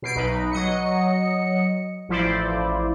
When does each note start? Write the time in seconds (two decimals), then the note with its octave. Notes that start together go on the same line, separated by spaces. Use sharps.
0.02 B2 C7 D7
0.16 B1 D#4 B4
0.52 F#3 D#5 C#7
2.09 A1 F3 E4 C5 D5